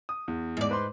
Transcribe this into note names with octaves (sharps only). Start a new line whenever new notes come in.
D#6
E2
G#2 D5
B4 C5 C6